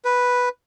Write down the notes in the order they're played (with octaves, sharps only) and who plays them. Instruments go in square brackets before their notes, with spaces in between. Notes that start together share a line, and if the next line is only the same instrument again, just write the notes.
[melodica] B4